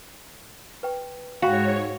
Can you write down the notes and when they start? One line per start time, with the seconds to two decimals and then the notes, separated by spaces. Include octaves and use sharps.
0.83 B4 G5
1.42 G#2 F#4 C#5 F5 G5 B5